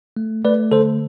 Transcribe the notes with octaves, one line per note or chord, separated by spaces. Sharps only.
A3
A3 B4 D5
D3 A4 C5